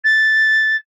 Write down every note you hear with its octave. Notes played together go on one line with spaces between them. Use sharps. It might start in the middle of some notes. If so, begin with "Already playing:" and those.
A6